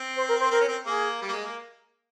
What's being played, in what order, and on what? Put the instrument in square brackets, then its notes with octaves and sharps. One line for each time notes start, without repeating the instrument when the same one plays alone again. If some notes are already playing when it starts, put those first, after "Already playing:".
Already playing: [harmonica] C4
[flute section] C5
A#4
C5
[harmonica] C4 [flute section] A#4
[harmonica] C#4
C4
[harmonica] A#3 [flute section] G#4
[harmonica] G3
A#3
G#3
A#3